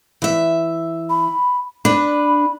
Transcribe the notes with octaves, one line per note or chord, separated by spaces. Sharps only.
E3 E5
B5
D4 B4 B5